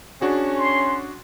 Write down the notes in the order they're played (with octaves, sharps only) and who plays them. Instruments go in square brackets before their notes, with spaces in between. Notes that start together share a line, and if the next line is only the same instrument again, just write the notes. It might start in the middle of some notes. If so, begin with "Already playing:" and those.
[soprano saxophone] C#4 [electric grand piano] D4 F#4 G#4
[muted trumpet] C6